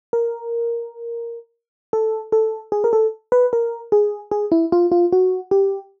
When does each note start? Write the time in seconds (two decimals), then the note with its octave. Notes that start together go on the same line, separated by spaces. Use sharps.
0.13 A#4
1.93 A4
2.32 A4
2.72 G#4
2.84 A#4
2.93 A4
3.32 B4
3.53 A#4
3.92 G#4
4.31 G#4
4.52 E4
4.72 F4
4.92 F4
5.12 F#4
5.51 G4